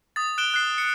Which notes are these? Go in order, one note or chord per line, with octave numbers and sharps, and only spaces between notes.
D#6 A6
F#6 D7 E7 G7
F#6 C7
C#7